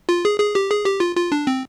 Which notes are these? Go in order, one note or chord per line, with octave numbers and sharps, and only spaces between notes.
F4
G#4
G#4
G4
G#4
G4
F4
F4
D4
C4